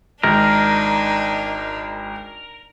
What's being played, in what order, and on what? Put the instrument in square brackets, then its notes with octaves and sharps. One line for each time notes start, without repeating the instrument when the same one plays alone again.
[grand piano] G#1 [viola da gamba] D4 D#4 [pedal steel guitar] A#4